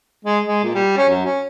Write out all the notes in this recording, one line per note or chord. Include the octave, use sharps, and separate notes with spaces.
G#3
G#3
A#2
G3
C#4
F#2
C#4